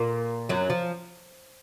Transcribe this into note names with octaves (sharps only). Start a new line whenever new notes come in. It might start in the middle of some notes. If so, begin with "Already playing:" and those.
Already playing: A#2 A#3
F#2 F#3
F3